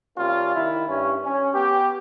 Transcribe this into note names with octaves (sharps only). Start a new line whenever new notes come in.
C3 G3 A#3 C#4 F4
D#3 E4
G2 C#4
C#4
B3 G4